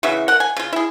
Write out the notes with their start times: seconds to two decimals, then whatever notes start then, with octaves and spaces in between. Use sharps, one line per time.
0.03 C#3 E3 F#4 E5
0.28 A#4 F#5
0.40 G#5
0.57 C#3 F4
0.73 E4 G#4